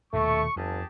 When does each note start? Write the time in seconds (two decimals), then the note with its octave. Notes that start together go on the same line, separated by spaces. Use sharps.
0.13 D#1 D#2 B2 A3 C#6
0.56 G1 F2 G4 G#4 A5